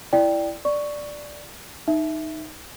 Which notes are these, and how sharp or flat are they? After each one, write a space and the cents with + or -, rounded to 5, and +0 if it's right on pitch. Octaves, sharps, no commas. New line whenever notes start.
E4 +10 D5 +0 G5 +0
D5 +0 C#6 +5
D#4 +0 E5 +0